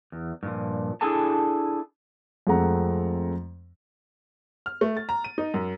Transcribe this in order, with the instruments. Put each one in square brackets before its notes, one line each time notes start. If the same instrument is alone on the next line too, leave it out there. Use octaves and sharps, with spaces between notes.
[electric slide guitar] E2
G2 A#2 F3
D4 E4 G#4 A4 G#5 A5
[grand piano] F2 G#3 A3 C4 F#5 A#5
[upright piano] F6
A3
A6
A#5
D#7
D#4
F#2